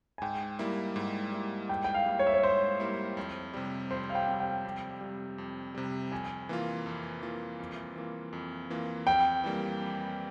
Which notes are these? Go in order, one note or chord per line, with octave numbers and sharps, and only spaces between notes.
G#5
G#2 G5
G3 A#3 E4
G#2
G3 A#3 E4
G#2 G5
G5
F5
G3 A#3 E4
C#5
E5
C#5
G#2 C5
G3 A#3 E4
F2
C3 G3
F2 C5
F5
G5
C3 G3
G5
F2
C3 G3
F2
C3 G3
F2 G#5
E3 A#3 F4
F2
E3 A#3 F4
F2
E3 A#3 F4
F2
E3 A#3 F4
F2 G5
E3 G3 A#3
F2